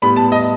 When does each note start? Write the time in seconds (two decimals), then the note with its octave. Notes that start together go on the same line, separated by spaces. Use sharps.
0.02 A2 G3 B3 B5
0.16 A5
0.32 D#5